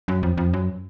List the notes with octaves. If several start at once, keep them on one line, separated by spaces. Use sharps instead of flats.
F#2
F2
F2
F#2